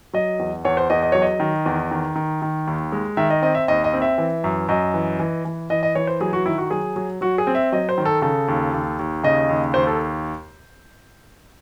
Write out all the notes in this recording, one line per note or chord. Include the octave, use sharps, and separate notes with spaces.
F#3 D#5
E2
E2 C#5
C5
E2 D#5
D#5
F#3 C#5
D#5
D#3
E2
D#3
D#3
D#3
D#2
G#3
D#3 E5
D#5
C4 D#5
E5
D#2 D#5
D#5
C4
E5
E3
F#2
F#2 D#5
E3
E3
E3
E3 D#5
D#5
E3 C#5
C5
F#3 G#4
F#4
D#3 E4
F#4
F#3 G#4
F#3
F#3 F#4
G#4
C4
E5
F#3 D#5
C5
D#3
A4
C#3 A4
D#2
D#2
D#2
C#3 D#5
D#2
D#2 C5
A4